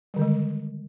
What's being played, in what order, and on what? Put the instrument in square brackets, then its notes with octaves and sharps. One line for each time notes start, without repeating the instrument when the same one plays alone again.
[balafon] G3
D#3
D3
G#3